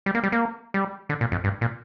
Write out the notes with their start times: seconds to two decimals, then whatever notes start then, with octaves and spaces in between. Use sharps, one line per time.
0.06 G3
0.15 A#3
0.23 G3
0.32 A#3
0.74 G3
1.09 D3
1.21 A#2
1.32 F2
1.44 G2
1.61 A#2